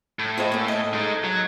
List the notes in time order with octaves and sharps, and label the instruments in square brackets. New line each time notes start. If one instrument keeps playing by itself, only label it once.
[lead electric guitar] A2
[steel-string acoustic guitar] F4 C5 D#5
A#3 C#4
A4 D#5
[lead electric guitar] G#3 D#4
F#3